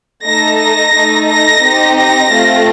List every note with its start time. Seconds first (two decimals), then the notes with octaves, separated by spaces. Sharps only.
0.25 A3 D#4 A4 A#6
0.59 A#6
0.94 A3 D#4 A4
1.28 A#6
1.64 C4 D#4 G4
1.98 A#6
2.32 A3 C4 F4